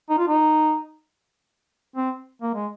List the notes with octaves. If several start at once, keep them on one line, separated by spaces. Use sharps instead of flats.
D#4
F4
D#4
C4
A#3
G#3